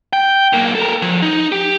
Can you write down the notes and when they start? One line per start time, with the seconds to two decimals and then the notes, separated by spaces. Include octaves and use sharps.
0.13 G5
0.53 B1 A#3
0.75 A4 A#4
1.02 F3
1.22 D#4
1.52 G4